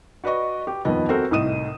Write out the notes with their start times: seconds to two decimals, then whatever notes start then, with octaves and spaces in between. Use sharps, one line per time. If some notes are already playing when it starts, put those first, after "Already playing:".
0.24 F#4 B4 D5 D#5 C#6
0.67 G4
0.85 D#1 F2 D#3 B3 D#5
1.09 C4 F#4 A4 A#4 C5
1.31 C2 A2 D#4 D#6 D#7 E7